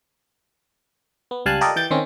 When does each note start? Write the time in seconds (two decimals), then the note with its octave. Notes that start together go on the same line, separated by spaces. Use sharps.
1.31 B3
1.46 C#2 G3 F5 G#5 A5 F#6
1.61 F4 G4 A4 A#4 D5 D#5
1.76 E3 G5 G6 A6
1.91 D#3 C4 C#4